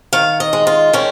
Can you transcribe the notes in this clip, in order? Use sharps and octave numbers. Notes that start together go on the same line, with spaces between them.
D#3 F5
D#5
G#3
F4
D#3 C#4